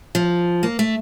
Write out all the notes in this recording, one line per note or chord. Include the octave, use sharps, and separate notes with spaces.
F3
A#3
A3